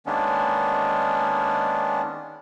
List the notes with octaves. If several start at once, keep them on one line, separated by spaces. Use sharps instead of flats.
D#3 G#3 A#3 B3 C#4 D4